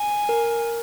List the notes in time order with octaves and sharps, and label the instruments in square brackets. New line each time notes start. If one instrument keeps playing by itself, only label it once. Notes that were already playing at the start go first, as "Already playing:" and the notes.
Already playing: [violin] G#5
[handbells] A#4